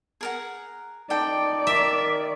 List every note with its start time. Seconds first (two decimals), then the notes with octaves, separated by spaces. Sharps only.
0.21 G#4 A#4 F#5
1.10 D#4 A4 D5 G5
1.67 D#3 E5